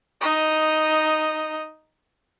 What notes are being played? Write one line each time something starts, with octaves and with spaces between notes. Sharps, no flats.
D#4 D#5